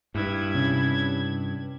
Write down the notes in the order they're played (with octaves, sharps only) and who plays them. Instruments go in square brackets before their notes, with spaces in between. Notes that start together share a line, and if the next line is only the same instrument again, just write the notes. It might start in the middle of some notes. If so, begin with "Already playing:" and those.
[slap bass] G2 [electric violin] E4 G#6
[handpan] C3 C#4